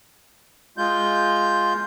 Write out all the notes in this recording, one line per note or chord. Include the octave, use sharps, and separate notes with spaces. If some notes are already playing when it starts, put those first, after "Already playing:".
G#3 F4 G6